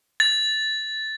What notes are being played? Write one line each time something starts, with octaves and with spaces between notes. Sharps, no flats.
A6